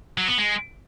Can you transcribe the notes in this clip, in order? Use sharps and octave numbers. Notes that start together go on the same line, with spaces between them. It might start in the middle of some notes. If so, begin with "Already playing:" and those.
F#3
B3
G#3